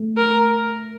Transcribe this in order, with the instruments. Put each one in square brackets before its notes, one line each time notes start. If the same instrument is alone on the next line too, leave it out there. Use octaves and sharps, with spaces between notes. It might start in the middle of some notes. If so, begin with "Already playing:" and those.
Already playing: [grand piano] A3
[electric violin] A#4